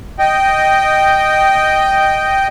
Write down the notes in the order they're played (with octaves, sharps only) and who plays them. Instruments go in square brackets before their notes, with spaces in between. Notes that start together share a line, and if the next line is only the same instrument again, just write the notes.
[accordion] D#5 G5